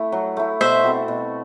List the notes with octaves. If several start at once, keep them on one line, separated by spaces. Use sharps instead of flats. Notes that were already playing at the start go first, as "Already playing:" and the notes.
Already playing: A3 E4
F#3
A3 E4
B2 C5 E5
A3 C4 F#4
B2